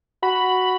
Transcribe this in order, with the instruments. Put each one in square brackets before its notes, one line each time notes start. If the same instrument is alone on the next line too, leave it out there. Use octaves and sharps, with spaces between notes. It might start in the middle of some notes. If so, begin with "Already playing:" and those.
[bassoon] F#4 [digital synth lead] B5